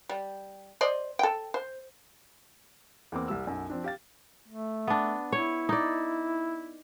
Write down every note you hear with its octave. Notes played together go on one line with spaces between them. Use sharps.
G3
C5 D5 D#5
A4 G5
C5
E2 A#3 C4 D6
C2 G3 E6
B1 F#2
F3 C4 D4
G4 F5 A6
A3
B3 D4
E4 C#5
D#4 D5